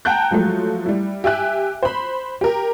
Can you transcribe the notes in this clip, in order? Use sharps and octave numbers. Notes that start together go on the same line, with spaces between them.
F#5 G5 A5 A#5 F#6 G6
F3 F#3 G#3 A3
G3 E4
G4 E5 G#5 F#6
C5 B5
G4 A#4